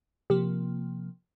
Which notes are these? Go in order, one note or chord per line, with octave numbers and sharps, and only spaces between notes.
C3 F3 A#3 G4